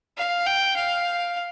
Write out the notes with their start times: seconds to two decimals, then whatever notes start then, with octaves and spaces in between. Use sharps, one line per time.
0.18 F5
0.47 G5
0.77 F5